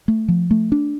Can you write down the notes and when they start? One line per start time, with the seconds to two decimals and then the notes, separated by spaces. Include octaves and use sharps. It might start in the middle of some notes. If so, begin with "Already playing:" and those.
0.08 A3
0.28 F3
0.51 A3
0.72 D4